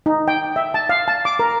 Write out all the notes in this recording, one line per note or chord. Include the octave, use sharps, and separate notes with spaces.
D#4
G5
E5
A5
F5
A5
D6
A#4